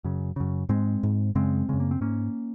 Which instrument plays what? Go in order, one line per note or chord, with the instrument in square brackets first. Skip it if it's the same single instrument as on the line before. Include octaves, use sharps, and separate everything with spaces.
[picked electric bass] F#2 C#3
F#2 C#3
G#2 G#3 C4
G#2
F#2 C#3 G#3 C4
F#2 C#3 G#3
A#3
C4
G#2 A#3 C#4